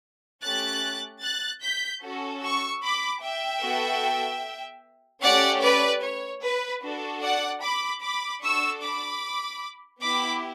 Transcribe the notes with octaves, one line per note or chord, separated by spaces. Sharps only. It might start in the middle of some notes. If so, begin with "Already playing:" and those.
A3 C#4 G4 F#6 A6
F#6 A6
G6 B6
C#4 F#4 A4
C#6 E6
B5 D6
E5 G5
B3 F#4 A4
A3 C#4 G4 D5 F#5
B4 D5
C#5
B4
D4 F#4 A4
D5 F#5
B5 D6
B5 D6
D4 F#4 A4 C#6 E6
B5 D6
B3 E4 G4 B5 D6